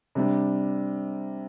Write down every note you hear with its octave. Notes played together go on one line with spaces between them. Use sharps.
C3 G3 D4